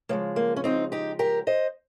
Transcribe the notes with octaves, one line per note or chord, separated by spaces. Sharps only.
C#3 F3 G#3 A#3
A#3
C#4
C4 D#4
D#4 G4
G4 A#4
C5 D#5